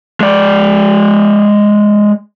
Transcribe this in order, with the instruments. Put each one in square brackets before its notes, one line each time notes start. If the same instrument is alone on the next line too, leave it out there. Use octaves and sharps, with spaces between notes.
[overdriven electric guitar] G#3 D5